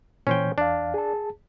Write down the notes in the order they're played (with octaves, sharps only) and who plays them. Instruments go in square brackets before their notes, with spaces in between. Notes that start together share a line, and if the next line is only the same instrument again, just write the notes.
[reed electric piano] A#2 E3 [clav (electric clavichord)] C#4 C5 G5
[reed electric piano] E2 F5 [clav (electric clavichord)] D4
[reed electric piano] G#4 A5